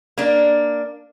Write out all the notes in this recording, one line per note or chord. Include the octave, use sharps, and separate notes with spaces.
A#3 D4